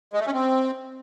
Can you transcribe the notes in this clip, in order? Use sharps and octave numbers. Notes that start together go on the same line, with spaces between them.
G#3
A3
C#4
C4